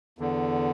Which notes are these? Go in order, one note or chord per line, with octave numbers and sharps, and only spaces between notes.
E2 D3